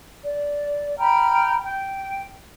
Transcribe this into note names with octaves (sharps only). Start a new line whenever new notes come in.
D5
G5 A#5 B5 F6
G5